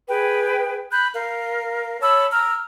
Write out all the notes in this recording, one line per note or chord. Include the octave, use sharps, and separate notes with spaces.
G#4 B4 G5
B5 F#6 G6
A#4 F5
C#5 A5 B5 E6
A#5 E6 F6